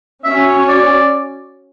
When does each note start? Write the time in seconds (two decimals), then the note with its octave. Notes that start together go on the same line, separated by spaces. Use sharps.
0.24 C#4 F#4 C#5 E5
0.69 D5